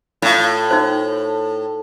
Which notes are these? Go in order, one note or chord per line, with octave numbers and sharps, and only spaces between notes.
A2 F4 F5
D#4 F#4 C5